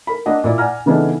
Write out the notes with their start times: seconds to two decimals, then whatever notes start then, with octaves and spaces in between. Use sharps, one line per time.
0.07 A#4 B5
0.26 A#3 D4 D#5 F#5
0.44 A#2 E4 D5
0.58 D5 F#5 G#5 A#5 F6
0.86 C#3 E3 B3 D4 D#4 A4